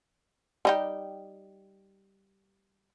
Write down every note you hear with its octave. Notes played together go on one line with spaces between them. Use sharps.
G3 D#4 G4